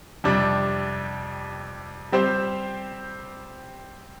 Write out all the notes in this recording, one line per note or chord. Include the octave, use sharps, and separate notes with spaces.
F2 C3 G3 D4
G3 C4 G4 C5